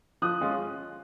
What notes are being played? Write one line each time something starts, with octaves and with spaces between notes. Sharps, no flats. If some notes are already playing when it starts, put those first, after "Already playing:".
F3 D#6 F#6
G#3 C#4 F4